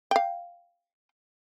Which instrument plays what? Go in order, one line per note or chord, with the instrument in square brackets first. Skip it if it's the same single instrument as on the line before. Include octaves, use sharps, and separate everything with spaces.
[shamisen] F5 G5